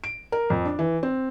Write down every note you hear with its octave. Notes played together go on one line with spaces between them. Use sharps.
D7
A#4
F2
D4
E3
C4